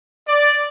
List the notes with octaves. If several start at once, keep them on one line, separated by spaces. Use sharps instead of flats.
D5